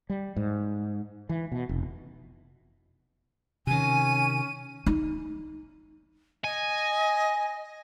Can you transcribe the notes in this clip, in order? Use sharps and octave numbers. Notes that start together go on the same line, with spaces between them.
G3
G#2
E3
B2
F1
C3 D#3 C#4 G#5 D#7
D#4
D#5 G#5